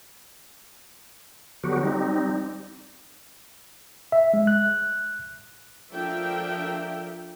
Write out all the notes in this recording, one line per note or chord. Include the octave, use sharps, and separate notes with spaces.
D3 F#3 B3 F#4 G4
G3 C4 D#4
E5
G#3
F#6
F3 D4 A4 A#4 E5 G5